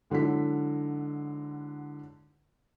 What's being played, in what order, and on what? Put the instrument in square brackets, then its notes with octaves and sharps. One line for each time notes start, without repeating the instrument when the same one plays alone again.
[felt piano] G#2 D3 F#3 E4 B6